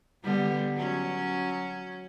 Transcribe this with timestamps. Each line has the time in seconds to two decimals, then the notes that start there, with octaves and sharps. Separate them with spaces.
0.23 D3 G3 B3
0.75 F#3 C#4